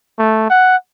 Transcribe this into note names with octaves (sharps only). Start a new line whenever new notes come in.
A3
F#5